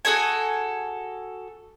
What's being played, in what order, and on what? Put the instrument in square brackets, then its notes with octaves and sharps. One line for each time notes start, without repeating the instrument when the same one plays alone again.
[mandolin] F#4 G#4 A4 G#5